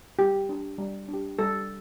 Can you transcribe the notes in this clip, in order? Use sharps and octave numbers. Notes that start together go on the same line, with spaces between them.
G3 G4
D4 G4
G3
D4
G4
G3 A4